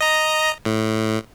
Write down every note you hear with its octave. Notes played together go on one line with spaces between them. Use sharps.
D#5 A#5
A2